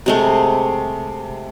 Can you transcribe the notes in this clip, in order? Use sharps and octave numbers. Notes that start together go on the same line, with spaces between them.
C3 G#3 A3